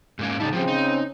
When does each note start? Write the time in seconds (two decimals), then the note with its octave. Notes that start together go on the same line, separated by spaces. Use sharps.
0.19 G#2 A#3 C#4
0.40 A2 C#3 G3 D#4 E4 A5
0.53 C#3 F3 G3 C4
0.68 D#4